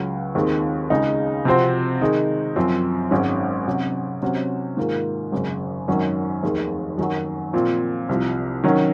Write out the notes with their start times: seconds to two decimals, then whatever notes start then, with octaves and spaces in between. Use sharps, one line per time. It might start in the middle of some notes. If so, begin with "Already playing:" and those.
Already playing: C#2 C#3 F#3
0.35 D#2 D#3 G#3 C4
0.90 C#2 C#3 G#3 D#4
1.45 C3 F3 C4 F#4 C5
2.02 D#3 G#3 D#4
2.56 F#2 F3 C4
3.11 G#1 G#2 F#3 C#4
3.67 C3 F#3 C#4
4.22 C3 F#3 C#4 F#4 C5
4.77 G#2 D#3 A#3 F4 A#4
5.32 G#1 F#2 C#3
5.88 G#1 F#2 D#3 F#3 C#4
6.43 F1 D#2 D#3 G#3
6.98 F#2 D#3 F#3
7.53 A#2 F3 C4
8.09 C2 C3 F3
8.64 D#3 F#3 C#4